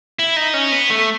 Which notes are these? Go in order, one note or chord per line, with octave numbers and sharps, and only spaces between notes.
E4
D#4
C#4
B3
A3